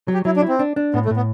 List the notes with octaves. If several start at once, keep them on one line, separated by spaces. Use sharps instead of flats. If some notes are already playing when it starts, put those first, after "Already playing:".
F#3
G4
F#3 E4
D4
E4
C4
D4
D4
A2 B3
A3
A2
B3